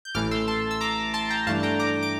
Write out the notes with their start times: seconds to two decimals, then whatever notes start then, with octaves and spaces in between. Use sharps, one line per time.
0.05 G6
0.15 A1 A2 E3 A3 D6 F6
0.31 C6 E6
0.48 A5 C6
0.71 E6
0.81 A#5 D6
1.14 A5 C6
1.30 G5 A#5
1.47 G2 E3 A3 D4 F5 A5
1.63 G5 A#5
1.79 A#5 D6
2.03 D6